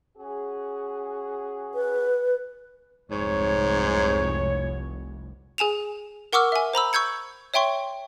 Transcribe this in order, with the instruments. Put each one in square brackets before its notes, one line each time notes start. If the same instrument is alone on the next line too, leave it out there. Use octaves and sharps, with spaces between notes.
[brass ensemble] C#4 F#4 G#4
[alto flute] B4
[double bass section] F1 C2 [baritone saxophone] G#2 [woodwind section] C#5
[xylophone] G#4 G#5 E7 F7
A#4 F#5 C#6 D6 E6 F6
E5 G#5
C5 A#5 B5 E6
C#6 E6 G6 G#6 C#7
C#5 E5 G5 C6 C#6